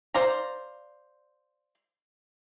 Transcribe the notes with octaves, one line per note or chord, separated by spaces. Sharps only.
C5 D5 F5 A#5